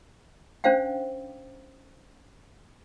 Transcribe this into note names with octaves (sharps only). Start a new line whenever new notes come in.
C#4 D4 C5 F5 G5